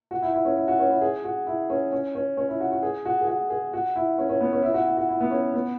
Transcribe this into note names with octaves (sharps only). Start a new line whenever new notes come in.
F#4
E4
E4
C#4
E4
F#4
C#4
E4
G#4
F#4
E4
C#4
C#4
C#4
C#4
E4
F#4
F#4
G#4
F#4
G#4
F#4
G#4
F#4
E4
C#4
C#4
B3
C#4
E4
F#4
E4
F#4
E4
B3
C#4
B3